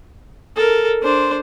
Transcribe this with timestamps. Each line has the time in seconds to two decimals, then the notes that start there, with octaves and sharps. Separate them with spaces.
0.56 A4 A#4
1.03 D4 C5